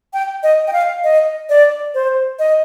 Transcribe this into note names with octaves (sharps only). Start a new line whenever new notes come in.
G5
D#5
G5
F5
D#5
D5
C5
D#5